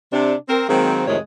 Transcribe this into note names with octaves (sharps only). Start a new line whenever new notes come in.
C3 D4
C4 A#4
D#3 F#3 G#3 A#3 C4
F2 A2 C3 D#3 G#3 C#5